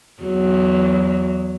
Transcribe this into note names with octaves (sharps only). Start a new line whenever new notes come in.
E2 F#3